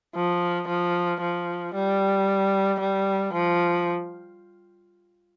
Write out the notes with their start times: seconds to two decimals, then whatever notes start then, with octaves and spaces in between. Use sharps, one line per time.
0.15 F3
0.68 F3
1.21 F3
1.74 G3
2.80 G3
3.33 F3